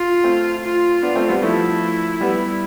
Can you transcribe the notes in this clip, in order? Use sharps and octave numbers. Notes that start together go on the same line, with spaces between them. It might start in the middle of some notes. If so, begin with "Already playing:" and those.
Already playing: F4
A3 C4
F4
B3 D4
A3 C4
G3 B3
F3 A3 E4
G3 B3